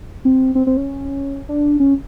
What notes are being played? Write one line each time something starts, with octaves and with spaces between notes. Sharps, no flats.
C4
C4
C4
C#4
D4
C#4